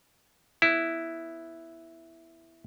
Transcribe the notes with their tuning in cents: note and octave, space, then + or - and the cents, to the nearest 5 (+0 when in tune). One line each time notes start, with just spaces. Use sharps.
B3 +0 E4 +0